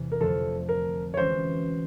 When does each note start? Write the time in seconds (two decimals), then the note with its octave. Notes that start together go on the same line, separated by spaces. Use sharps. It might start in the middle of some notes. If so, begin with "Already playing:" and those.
Already playing: E2 C3 E3 G3
0.12 A#4
0.20 F2 D3 F3 A3 A4
0.69 A#4
1.14 C#5
1.17 E3 G#3 C#4 F#4 C5